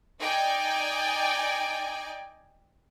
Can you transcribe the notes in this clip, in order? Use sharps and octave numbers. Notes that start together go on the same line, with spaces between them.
D#4 D5 G5 G#5